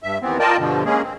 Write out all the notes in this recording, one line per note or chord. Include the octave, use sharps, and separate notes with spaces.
G2 E5
D#2 E3 B3 C4
F4 A#4 D5 D#5 G5 A5
G2 B2 D3 F3
G#3 A#3 C#4 G#4
C4